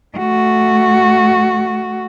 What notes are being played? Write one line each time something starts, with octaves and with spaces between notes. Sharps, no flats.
A3 F#4